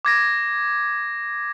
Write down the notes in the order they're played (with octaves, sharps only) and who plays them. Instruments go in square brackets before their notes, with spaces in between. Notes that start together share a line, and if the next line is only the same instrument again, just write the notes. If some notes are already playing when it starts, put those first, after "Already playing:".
[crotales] D6 G#6 A#6